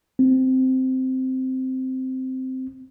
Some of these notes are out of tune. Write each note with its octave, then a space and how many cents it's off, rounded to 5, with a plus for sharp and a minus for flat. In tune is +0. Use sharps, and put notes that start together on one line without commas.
C4 -10